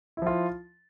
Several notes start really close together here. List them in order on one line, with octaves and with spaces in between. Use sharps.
E4 F3 F4